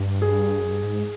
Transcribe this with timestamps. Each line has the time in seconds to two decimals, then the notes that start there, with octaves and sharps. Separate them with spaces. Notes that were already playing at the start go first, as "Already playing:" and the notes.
Already playing: G2
0.22 G#4
0.60 F#2
0.72 G2
0.84 G#2